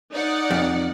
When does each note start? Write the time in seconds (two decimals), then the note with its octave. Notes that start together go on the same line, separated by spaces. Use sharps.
0.14 D#4 D5 F#5
0.51 F2